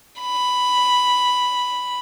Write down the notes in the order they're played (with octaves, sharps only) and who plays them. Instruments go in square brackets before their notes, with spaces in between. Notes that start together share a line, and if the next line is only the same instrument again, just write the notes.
[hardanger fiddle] B5